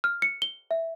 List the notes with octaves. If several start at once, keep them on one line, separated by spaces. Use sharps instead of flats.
F6
C#7
G7
E5